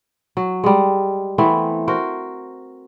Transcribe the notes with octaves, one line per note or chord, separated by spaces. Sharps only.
F#3
G3 G#3
E3 A3 B3 C4
F#4 A#4 C5